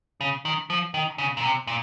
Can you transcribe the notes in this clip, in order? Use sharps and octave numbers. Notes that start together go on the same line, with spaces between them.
C#3
D#3
F3
D#3
C#3
A#2
C3
A#2